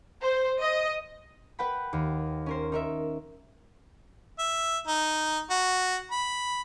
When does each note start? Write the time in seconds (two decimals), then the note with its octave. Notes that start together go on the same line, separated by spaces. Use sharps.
0.22 C5
0.61 D#5
1.59 B4 F#5 G5 B5
1.93 D#2
2.46 C#4 A#4 C5
2.72 D#4 A#4 E5
4.39 E5
4.87 D#4
5.51 F#4
6.11 B5